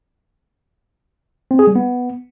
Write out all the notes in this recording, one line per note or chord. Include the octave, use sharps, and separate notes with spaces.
C4
G#4
G3
B3